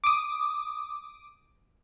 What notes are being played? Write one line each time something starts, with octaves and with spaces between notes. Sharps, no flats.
D6 D#6